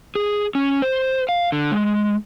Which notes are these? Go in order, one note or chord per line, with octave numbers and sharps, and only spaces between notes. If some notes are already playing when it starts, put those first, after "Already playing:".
G#4
C#4
C5
F5
D3
G#3